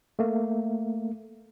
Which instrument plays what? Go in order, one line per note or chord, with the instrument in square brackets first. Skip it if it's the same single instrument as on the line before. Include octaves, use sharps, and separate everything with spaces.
[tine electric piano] A3 A#3